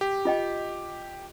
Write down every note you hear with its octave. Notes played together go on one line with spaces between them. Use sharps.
G4
F4 D#5 G5